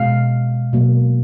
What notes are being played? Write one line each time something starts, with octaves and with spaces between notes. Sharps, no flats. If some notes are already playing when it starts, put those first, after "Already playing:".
Already playing: B2 G#3 F5
B2 F#3 A#3